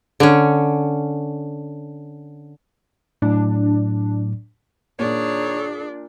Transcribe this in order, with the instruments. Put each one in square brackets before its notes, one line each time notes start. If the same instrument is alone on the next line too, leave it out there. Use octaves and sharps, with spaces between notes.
[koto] D3 C#4
[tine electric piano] A2 F#3 [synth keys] D4
[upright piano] A#2 [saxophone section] D#3 C#5 [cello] D4 [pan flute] G#4